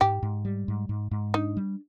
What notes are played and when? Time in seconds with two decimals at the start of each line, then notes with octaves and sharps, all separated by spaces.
0.01 G#2 G4
0.23 G#2
0.45 G3
0.68 G#2
0.89 G#2
1.11 G#2
1.34 D4 D#4
1.57 G3